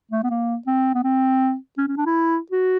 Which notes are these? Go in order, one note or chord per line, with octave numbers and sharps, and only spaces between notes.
A3
B3
A#3
C4
B3
C4
C#4
C#4
D4
E4
F#4